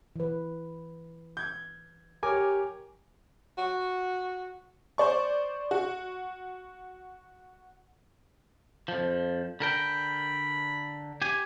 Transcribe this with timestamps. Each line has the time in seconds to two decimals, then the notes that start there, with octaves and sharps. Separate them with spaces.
0.16 E3 B4
1.37 G6 G#6
2.23 G4 A#4 C#5 G#5 D6
3.58 F#4
4.98 C5 D5 C#6
5.71 F#4
8.88 F2 F3
9.60 D3 A#4 G5 B5
11.22 G4 G#5